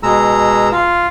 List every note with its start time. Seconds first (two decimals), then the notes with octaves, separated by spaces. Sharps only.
0.03 B2 G#3 A#5 E6
0.72 F4